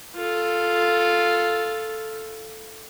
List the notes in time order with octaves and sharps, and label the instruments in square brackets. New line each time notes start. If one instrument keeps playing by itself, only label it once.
[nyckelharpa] F4 A4